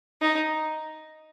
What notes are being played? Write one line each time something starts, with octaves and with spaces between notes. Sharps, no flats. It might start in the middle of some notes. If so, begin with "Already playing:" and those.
D#4